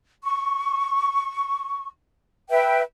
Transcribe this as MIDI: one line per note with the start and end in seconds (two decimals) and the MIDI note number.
0.24 1.88 85
2.49 2.81 71
2.49 2.81 76
2.49 2.81 79